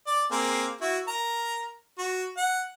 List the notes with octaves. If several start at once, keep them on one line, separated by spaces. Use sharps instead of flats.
D5
A#3 C4 G#4
E4 F#4
A#4 A#5
F#4
F#5